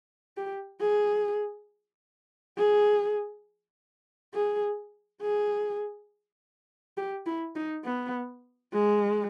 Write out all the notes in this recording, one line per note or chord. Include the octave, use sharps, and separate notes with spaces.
G4
G#4
G#4
G#4
G#4
G4
E4
D#4
B3
G#3